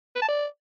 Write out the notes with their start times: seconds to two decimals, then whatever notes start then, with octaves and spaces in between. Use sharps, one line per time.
0.16 B4
0.22 A5
0.28 D5